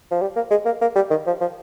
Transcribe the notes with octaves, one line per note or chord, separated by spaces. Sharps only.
F3
G3
A#3
G#3
A#3
A#3
G3
D#3
F3
F3